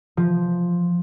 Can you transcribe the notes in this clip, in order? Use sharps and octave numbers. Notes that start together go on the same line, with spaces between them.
F3